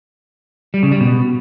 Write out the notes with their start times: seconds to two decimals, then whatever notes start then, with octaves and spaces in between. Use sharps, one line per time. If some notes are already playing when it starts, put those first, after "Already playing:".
0.74 G3
0.83 C#3
0.92 G3
1.01 B2